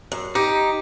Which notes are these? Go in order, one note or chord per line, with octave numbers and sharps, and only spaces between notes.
F#2
D#4 G4